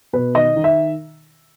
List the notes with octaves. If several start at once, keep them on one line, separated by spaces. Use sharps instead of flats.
B2 B4
D#3 D#5
D#3
E5